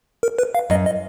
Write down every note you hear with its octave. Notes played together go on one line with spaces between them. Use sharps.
A#4
B4
F5
F#2 D#5
D#5